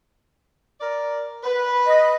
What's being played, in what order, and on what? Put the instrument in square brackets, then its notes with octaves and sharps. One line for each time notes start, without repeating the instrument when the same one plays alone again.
[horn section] A#4 D5
B4
[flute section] D#5